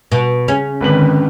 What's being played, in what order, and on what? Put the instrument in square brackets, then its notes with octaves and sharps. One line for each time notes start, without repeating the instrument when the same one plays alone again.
[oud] B2
[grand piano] C#3 [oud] C#4
[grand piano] G#1 B4 F#7 [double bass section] D3 D#3